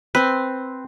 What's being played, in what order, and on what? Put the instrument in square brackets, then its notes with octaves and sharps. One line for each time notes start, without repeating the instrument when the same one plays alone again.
[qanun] C4 C6 [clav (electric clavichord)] B4